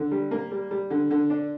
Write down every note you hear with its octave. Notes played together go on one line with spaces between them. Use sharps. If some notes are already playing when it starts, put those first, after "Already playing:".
Already playing: D3
G3
A#3
G3
G3
D3
D3
D4